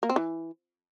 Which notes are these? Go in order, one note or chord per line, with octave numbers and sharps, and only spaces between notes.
A#3
C4
E3